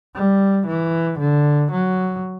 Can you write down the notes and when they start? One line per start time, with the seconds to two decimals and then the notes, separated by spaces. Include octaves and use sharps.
0.15 G3
0.67 E3
1.19 D3
1.72 F#3